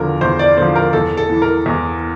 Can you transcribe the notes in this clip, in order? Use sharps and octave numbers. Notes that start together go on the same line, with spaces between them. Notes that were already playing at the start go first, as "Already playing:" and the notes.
Already playing: E2 D3 F3 A#4
E2 C5
D5
D3 F3 C5
A#4
E2 A4
A4
E3
A#4
E2